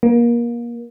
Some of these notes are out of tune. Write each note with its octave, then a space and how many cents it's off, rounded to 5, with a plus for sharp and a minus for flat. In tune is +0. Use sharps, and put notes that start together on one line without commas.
A#3 +30